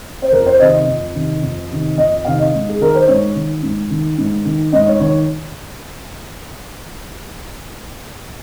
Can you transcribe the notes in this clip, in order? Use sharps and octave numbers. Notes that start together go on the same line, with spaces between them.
C5
F2 A#4
C5
C3 D#3 D#5
D#5
F2
C3 D#3
F2
C3 D#3
F2 D#5
C3 D#3 F5
D#5
G#2
G#4
D#3 A#4
C5
G#2 C#5
D#3
G#2
D#3
G#2
D#3
G#2 D#5
C#5
D#3 C#5